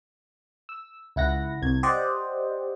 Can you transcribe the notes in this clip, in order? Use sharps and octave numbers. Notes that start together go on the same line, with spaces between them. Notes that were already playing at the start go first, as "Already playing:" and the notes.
E6
C#2 E4 F#5 A#6
C2 G#6
G4 C5 D5 D#5 F#5